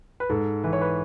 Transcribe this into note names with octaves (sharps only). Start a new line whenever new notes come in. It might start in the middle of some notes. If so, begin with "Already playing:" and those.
B4
G#2 A4
E3 B4
C#5
B4